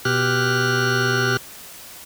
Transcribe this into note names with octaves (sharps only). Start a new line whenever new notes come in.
B2 G4 F6 F#6